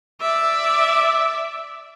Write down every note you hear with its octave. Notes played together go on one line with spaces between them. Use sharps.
D5 E5